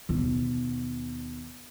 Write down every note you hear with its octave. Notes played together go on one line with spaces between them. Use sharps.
D#2 B2